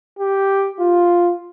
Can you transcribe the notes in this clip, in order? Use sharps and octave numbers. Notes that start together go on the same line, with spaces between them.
G4
F4